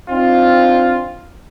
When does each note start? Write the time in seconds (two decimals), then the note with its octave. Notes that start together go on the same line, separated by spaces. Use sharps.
0.11 C4 D4 D#4 F4